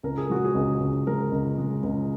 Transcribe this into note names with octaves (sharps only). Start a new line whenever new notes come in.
C#2 A#4
G#4
G#3 F#4
G#4
C#2
C#2
G#3 A#4
C#2
G#3
C#2